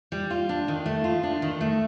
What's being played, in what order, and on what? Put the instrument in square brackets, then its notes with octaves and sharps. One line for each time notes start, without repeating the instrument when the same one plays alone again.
[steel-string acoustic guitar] G3
F4
D4
D#3
A3
F4
D4
D#3
A3